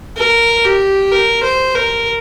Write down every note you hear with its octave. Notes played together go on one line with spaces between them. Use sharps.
A#4
G4
A#4
C5
A#4